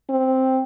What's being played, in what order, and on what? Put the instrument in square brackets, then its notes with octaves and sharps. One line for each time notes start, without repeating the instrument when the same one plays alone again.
[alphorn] C4